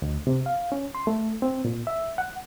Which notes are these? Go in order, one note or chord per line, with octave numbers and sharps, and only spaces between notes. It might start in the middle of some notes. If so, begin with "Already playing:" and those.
D2
C3
F5
C#4
C6
A3
C4
A#2
E5
F#5